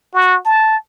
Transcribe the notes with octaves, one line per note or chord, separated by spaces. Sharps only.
F#4
A5